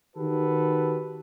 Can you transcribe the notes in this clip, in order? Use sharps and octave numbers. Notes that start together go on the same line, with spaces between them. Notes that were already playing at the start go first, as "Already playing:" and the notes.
D#3 F#4 G4 A4 B4